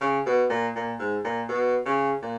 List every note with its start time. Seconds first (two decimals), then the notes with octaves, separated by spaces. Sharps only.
0.01 C#3
0.26 B2
0.50 A#2
0.76 A#2
0.99 G#2
1.24 A#2
1.48 B2
1.85 C#3
2.23 A#2